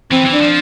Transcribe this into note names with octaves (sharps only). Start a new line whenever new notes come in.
E3 C4
E3
D4
F3